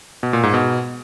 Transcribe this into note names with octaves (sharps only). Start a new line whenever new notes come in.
B2
A#2
G#2
B2